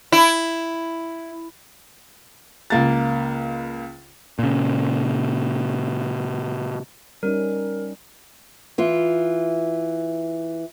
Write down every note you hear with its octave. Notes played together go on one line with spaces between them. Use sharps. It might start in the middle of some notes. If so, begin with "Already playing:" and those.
E4
C#2 A#3 A6
A#2 C#3
G3 C#4 D#4 A#4
E3 F4